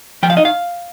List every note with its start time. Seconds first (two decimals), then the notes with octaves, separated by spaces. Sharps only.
0.23 F3 G5
0.30 F5
0.37 D#4 D#5
0.45 F5